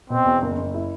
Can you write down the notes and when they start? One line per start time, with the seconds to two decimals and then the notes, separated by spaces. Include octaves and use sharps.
0.10 B2 C4
0.26 E2
0.42 F#1
0.57 F#1
0.74 E4